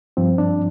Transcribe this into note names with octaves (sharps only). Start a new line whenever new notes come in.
G2 F3 C4
D4